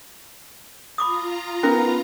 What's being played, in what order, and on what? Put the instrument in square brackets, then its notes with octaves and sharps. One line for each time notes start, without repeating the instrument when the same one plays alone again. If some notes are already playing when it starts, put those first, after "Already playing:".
[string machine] F4 A#5 [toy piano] B5 D6 D#6
[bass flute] B3 [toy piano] C#4 [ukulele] D#4 A#4